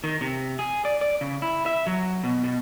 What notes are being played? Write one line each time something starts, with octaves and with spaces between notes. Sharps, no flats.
D#3
C3
G#4
D5
D5
C#3
E4
E5
F#3
B2
B2